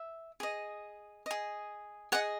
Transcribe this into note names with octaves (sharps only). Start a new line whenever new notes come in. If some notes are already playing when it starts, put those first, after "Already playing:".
Already playing: E5
G#4 D#5
G#4 D#5
G#4 D#5 F#5